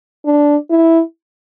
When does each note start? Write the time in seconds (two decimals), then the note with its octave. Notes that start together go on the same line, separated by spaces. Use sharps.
0.25 D4
0.70 E4